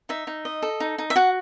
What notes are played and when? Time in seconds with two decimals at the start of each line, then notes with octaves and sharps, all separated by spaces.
0.09 D#4 E5
0.27 D#4
0.45 D#5
0.62 A4
0.80 D#4
0.98 D#4
1.10 E5
1.16 F#4 F#5